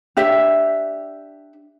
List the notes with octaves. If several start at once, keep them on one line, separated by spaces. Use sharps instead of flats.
D4 G4 E5